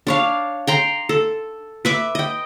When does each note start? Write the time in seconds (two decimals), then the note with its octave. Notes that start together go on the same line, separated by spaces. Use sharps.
0.07 D4 C#5 F5
0.67 G5 A#5 C6
1.09 A4
1.85 B4 E5 D6
2.15 D#5 G5